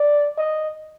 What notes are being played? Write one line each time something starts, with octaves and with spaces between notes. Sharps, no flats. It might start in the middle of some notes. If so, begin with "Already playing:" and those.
Already playing: D5
D#5